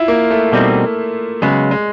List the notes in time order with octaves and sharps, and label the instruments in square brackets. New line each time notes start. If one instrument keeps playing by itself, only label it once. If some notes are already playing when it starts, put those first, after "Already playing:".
Already playing: [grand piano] E4 F4
A#3
A3
[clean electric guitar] B2 G3 C4 D#4
[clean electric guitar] C#3 F#3 B3 [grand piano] G#3
[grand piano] G#3